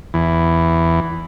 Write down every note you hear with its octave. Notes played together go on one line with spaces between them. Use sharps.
E2